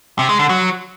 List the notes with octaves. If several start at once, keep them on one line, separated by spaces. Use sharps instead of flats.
C3
G#3
D3
F#3